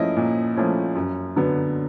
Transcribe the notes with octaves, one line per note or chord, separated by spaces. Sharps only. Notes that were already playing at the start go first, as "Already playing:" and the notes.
Already playing: A#2 F3 A3 C#4 E4 D#5
A#2
F3 A3 C#4 E4
F#2
D3 F#3 B3